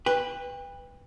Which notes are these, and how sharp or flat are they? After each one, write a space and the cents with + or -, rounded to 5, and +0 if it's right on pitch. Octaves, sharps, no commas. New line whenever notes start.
B4 +0 G5 +35